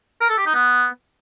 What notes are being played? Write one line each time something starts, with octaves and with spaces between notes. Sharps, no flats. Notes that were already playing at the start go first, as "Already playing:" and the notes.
A#4
A4
G4
D#4
B3